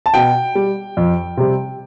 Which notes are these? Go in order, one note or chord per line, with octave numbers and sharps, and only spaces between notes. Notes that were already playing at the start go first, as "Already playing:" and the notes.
A5
B2 G5
G3
F2
C3 G3